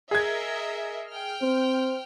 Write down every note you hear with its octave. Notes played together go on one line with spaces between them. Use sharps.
G#4 A#4 D#5 E5 G#6
G5 F6
C4 C5